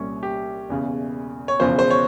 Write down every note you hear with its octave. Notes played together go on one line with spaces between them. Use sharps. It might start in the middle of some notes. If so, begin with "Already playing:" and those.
Already playing: C2 A#2 G3 C#4
G4
E1 E2 C#3
C#5
E1 E2 C#3 F3 C5
C5
C#5